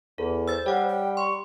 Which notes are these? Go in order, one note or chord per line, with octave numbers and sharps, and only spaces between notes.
E2 A4
C5 E6 A6
G3 C#5 F#5
G5
C6 C#6